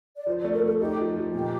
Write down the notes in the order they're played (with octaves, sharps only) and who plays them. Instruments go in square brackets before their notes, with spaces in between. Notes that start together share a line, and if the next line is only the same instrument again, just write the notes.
[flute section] D5
[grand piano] F3 [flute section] C5
[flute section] D5
[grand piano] A3
[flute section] A#4
[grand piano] A3 [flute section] A4
[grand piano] D#4 [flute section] G4
[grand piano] F3
F3
[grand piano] A#2 [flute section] G4